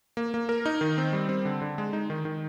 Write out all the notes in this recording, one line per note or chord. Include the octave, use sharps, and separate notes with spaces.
A#3
A#3
A#4
D#4
D#3
C4
G3
C4
D3
D3
G#3
D#4
D#3
D#3